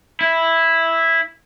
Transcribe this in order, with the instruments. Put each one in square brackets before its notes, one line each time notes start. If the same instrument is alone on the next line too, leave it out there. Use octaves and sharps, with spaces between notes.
[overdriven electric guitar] E4